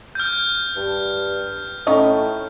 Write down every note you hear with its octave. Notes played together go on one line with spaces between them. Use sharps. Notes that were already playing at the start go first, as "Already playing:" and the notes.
F6 G6
G2
A2 C#4 D#4 D#5